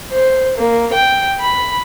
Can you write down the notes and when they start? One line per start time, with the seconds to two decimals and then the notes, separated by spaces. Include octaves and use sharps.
0.12 C5
0.58 A#3
0.93 G5
1.40 B5